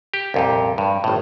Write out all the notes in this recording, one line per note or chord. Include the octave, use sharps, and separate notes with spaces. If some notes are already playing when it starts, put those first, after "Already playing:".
G4
C2 F2 A#2
G2
G#1 A2